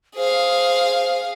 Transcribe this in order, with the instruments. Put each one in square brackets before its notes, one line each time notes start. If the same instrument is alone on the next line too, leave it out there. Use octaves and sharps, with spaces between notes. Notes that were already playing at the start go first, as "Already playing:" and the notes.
[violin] G#4 F5 [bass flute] C5